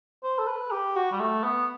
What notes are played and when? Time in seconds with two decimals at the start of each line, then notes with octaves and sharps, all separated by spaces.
0.23 C5
0.39 A4
0.48 B4
0.71 G4
0.96 F#4
1.12 G3
1.20 A3
1.44 B3